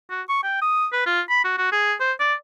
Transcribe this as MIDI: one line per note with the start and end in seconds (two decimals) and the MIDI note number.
0.10 0.22 66
0.29 0.39 85
0.44 0.59 79
0.61 0.87 87
0.93 1.04 71
1.06 1.21 65
1.30 1.43 83
1.45 1.53 66
1.58 1.71 66
1.72 1.93 68
2.00 2.12 72
2.20 2.34 74